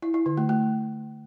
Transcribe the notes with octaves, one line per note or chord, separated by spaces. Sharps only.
E4
E4
D3
A3
A3